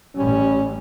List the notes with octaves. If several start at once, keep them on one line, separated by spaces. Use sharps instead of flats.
A1 G3 C#4